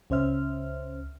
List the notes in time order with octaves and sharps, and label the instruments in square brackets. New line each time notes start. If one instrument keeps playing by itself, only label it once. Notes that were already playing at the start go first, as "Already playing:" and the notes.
[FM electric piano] C#2 C#4 C5 E5 F6